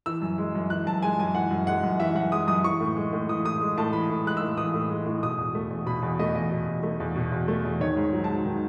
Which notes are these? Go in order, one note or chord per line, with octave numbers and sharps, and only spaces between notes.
E3 E6
F#2
G#3
F#2
E3 F#6
F#2 A5
G#3 G#5
F#2 G#5
E3 F#5
F#2
G#3 F#5
F#2
E3 E5
F#2 F#5
G#3 D#6
F#2 D#6
E3 C#6
A2
G#3
A2
E3 D#6
A2 D#6
G#3
A2 A5
E3 B5
A2
G#3 F#6
E6
A2
E3 D#6
A2
G#3
A2
B2 D#6
E2
A3
E2
B2 B5
E2
A3 D#5
E2 D#5
B2
E2
A3
E2
B2
E2
A3
E2
D#3 C#5
G#2
F#3
A5
G#2
D#3